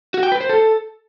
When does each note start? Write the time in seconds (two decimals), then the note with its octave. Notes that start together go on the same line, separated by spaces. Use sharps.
0.14 F#4
0.23 G5
0.32 B4
0.41 C5
0.49 A4